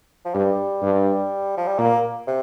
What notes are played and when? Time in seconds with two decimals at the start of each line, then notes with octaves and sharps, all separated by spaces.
0.25 F3
0.34 G2 G3
0.82 G2
1.57 F3
1.68 G3
1.78 A#2 A#3
2.27 C3